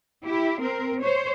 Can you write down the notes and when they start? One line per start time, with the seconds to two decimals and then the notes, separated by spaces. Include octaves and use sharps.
0.25 E4 G4
0.61 C4 A#4
1.01 C5 C#5